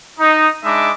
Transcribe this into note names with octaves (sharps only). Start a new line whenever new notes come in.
D#4
G#3 D4 D#4 E5 B5 D6